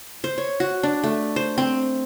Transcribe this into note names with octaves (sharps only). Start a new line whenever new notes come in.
C5
C#5
F#4
D4
A3
C5
C4